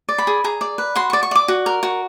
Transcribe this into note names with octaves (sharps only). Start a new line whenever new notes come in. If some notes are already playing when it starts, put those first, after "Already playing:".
D5
B5
G#4
G#4 A#5
D5
B4
F#4 C6
C#6
D5
C#6
D5 D6
F#4
A#4
F#4